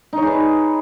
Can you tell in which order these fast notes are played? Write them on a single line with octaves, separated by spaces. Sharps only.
D#4 C#5 G#4 B4